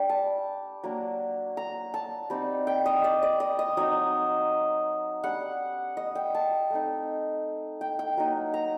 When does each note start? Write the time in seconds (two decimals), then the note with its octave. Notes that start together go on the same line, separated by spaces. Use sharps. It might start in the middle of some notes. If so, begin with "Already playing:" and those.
Already playing: G3 D4 G5
0.09 A5
0.84 F#3 A#3 D4
1.57 A#5
1.94 A5
2.30 G3 C4 D#4
2.67 G5
2.86 D#5
3.04 D5
3.23 D5
3.40 D#5
3.59 D#5
3.77 F#3 C4 D#4 D#5
5.23 G3 D4 F#5
5.97 D#5
6.15 G5
6.35 A5
6.70 A3 C4 D#4
7.81 G5
7.99 G5
8.17 F#3 A#3 D#4
8.54 A#5